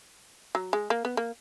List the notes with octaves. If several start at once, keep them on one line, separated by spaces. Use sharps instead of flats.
F#3
G#3
A#3
B3
A#3